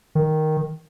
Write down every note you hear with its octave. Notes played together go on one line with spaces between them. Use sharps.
D#3